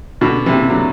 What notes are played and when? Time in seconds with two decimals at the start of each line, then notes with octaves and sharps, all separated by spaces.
0.21 B2 D3
0.46 C3 E3
0.70 D3 F#3